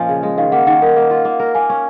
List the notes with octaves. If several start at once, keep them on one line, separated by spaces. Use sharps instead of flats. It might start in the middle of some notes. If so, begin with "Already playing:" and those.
Already playing: A#2 F3 C#4 D#5 G#5
C#3
G#3
D#3 F5
A#3 F#5
D#3 F#5
D#4 A#4
A#3
F4
A#3
A#4
A#3 G#5
C#4